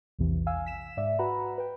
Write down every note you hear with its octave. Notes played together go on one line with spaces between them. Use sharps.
A#1 E2 C3 E3
F5 G#5 E6
B6 E7
G#2 D5 E5
F#4 B4 F#5 A#5 B5
B4 G5